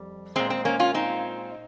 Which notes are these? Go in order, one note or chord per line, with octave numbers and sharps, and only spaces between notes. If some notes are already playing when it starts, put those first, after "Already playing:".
Already playing: F2 G3
A#2 G#3 C4
C4
A#3 C#4
C#4 F4
C4 D#4